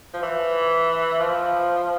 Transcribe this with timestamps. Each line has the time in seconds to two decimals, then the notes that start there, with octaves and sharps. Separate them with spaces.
0.13 F3
0.23 E3
1.19 F3